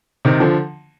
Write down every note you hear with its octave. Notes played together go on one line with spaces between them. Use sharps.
C3 D#3
D3 F3